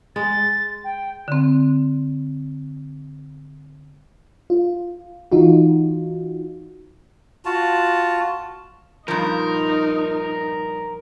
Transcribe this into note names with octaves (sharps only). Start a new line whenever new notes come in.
G#3 A6
G5
D3 C4
F4
E3 D#4 F4 F#4
F4 F#4 A5
G2 A#2 F3 D#4 A#4